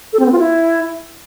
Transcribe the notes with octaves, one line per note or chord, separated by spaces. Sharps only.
A4
C4
B3
F4
E4